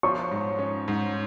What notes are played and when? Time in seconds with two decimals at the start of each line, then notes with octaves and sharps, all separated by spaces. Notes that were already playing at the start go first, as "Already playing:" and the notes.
0.03 F3 C#5 C#6
0.31 G#2
0.59 C#4
0.88 G#2